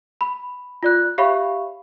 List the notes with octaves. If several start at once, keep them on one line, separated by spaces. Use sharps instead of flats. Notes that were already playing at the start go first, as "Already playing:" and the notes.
B5
F4 D5 F#6
G4 C#5 E5 F5 B5 C#6